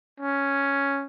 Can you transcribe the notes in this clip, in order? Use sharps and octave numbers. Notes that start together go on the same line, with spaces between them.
C#4